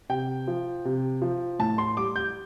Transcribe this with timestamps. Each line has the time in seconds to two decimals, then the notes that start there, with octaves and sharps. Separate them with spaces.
0.09 C3 G5
0.47 F3
0.85 C3
1.22 F3
1.59 A2 A5
1.78 C6
1.97 G3 D6
2.16 G6